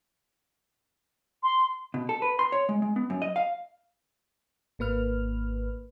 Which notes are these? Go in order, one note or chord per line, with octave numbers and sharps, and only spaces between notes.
C6
B2
A4
B4
C6
C#5
G#3
G#3
B3
F#2
D#5
F5
G#1 A#3 B4 F6